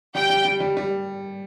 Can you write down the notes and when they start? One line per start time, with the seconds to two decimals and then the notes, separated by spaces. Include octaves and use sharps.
0.14 G3 G5
0.30 G3
0.45 G3
0.60 G3
0.77 G3